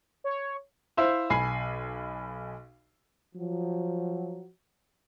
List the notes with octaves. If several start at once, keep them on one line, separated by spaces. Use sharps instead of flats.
C#5
E4 C5 E5 F5
B1 G#5 B5 C7
F3 F#3